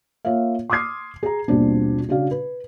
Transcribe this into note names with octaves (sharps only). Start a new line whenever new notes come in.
A#3 F4 C#5 E5 F5
C6 D6 D#6 F6 G#6 C7
G#4 A#5
D#1 A#1 B2 G3 C4 D4
C#3 D4 F#4 D5 F5
B4